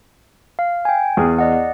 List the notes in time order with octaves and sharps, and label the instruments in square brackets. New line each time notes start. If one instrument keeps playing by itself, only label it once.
[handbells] F5
G5 G#5
[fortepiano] E2 G#4 [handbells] B3
[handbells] D5 D#5 F#5